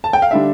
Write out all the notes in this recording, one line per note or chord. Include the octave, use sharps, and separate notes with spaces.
A5
G5
F5
D3 G3 D4 E5